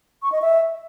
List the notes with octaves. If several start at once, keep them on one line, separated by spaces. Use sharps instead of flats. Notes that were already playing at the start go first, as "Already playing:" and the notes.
C#6
D#5
E5